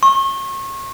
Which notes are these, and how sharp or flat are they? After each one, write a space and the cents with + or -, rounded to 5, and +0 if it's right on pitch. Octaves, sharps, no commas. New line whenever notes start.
C#6 -35